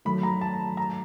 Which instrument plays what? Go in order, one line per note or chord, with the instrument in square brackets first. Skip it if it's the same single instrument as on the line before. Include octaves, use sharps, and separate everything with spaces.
[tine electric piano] D#3 F#3 A3 [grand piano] B5
[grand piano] A#5
A5
A#5